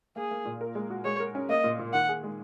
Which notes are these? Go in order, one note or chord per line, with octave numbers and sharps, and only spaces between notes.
A#3 G#4
A#3
A#2
A#4
G#3
F#4
G#3 C#5
A#4
C#4
A#3 D#5
A#2
A#2
D#3 F#5
G#4
G#3